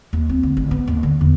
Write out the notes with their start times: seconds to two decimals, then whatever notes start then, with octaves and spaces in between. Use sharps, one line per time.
0.13 D#2
0.30 C4
0.43 D2
0.57 A1
0.71 B3
0.88 D#2
1.03 D3
1.21 E2